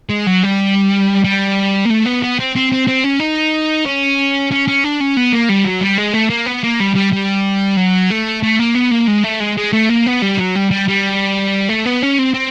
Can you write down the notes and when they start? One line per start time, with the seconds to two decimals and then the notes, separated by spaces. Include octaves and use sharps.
0.10 G#3
0.27 F#3
0.43 G3
1.24 G3
1.85 A#3
1.90 A3
2.05 B3
2.22 B3
2.39 C4
2.55 C4
2.72 C4
2.87 C4
3.04 C#4
3.20 D#4
3.85 C#4
4.52 C#4
4.68 C#4
4.84 D4
5.00 C#4
5.17 B3
5.33 A#3
5.49 G3
5.65 F#3
5.81 G3
5.98 G#3
6.14 A3
6.30 A#3
6.46 B3
6.63 A#3
6.80 G3
6.95 G3
7.12 G3
7.77 F#3
8.11 A3
8.43 A3
8.59 A#3
8.75 B3
8.91 A#3
9.08 G#3
9.24 A3
9.40 G#3
9.57 G#3
9.73 A3
9.90 A#3
10.06 B3
10.22 G3
10.39 F#3
10.55 G3
10.71 G3
10.88 G3
11.69 A3
11.85 B3
12.02 C#4
12.19 C4
12.34 C4